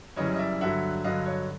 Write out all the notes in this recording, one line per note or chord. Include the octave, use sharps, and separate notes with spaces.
F#2 C#3 E3 G3 C#5 D#5
D#5
D5 E5
G2 D3 F#3 E5 F#5
G2 D3 F#3 D#5 F5
C#5 D#5